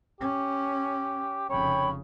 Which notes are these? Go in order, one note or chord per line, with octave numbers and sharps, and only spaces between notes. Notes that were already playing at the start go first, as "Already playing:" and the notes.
C#4 G4
F1 C#3 C#5 G5 B5